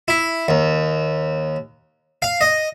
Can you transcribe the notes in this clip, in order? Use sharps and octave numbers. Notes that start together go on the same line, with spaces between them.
E4
D#2
F5
D#5